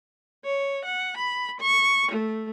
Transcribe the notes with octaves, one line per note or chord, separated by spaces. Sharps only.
C#5
F#5
B5
C#6
A3